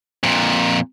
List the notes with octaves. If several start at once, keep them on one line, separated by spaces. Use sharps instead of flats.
F2 A#2